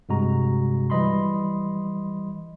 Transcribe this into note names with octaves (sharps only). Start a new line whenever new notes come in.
G2 C3 G#3 F#4 A#5
E3 G3 D#5 B5 C6